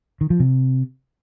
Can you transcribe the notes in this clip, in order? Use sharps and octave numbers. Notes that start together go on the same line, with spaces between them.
D#3
F3
C3